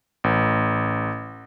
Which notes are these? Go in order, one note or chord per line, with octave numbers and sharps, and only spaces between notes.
A1